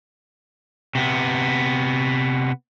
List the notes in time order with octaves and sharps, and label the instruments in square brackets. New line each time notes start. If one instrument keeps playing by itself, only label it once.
[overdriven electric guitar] C3 B3